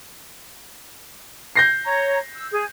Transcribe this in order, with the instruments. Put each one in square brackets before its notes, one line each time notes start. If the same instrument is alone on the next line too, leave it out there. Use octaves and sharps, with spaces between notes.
[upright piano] G6 A#6 C7
[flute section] C#5 A#5
E6
G#4